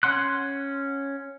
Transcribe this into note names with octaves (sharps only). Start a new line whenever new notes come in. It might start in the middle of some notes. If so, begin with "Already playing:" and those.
C#4 F#5 C6 F#6